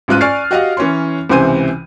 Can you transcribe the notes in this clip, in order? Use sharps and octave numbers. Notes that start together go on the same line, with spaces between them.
A1 G#2 F4 F#6 D#7
D5 G#5 C#6 F6 A6 C7
F#4 G4 D#5 F5 F#5
E3 C#4 C#5 C6
C#2 C3 E3 C5 G#5 D#7